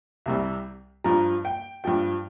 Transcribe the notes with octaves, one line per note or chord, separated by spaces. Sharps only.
C2 C3 G3
G2 F3 A#5
G5
G2 F3 G5